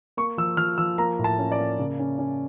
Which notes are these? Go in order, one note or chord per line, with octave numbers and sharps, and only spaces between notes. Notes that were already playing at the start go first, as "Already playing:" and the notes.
A#3 C#6
F3 E6
F3 F6
F3 E6
A#3 A#5
A2
A5
C#4
D5
A#3
C#3
C#4
C#4